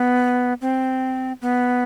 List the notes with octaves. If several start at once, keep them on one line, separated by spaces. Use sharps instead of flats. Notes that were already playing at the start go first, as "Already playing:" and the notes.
Already playing: B3
C4
B3